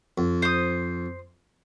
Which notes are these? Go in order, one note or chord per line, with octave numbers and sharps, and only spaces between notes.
F2
C5 D#6